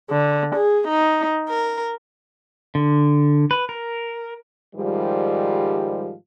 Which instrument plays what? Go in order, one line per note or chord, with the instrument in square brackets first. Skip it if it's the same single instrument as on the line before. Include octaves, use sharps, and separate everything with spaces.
[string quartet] D3
G#4
D#4
A#4
[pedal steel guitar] D3
B4
A#4
[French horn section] G#2 D#3 F3 G3